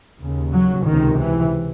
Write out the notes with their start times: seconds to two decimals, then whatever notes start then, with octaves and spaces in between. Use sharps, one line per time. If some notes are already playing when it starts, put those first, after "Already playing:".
0.19 D#2 C#3
0.53 F#3
0.86 C#2 C3 D#3
1.19 E3